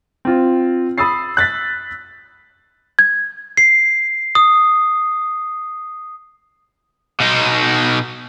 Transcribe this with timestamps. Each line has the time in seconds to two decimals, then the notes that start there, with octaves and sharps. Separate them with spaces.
0.25 C4 F4
0.98 B5 D#6 E6 A6 C7
1.37 F#6 A6 B6
2.99 G#6
3.57 C7
4.35 D#6
7.20 B2 D#4